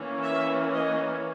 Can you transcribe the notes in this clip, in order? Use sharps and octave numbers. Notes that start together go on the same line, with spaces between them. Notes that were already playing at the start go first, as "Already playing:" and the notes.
Already playing: E3 A#3 C#4
E5
D#5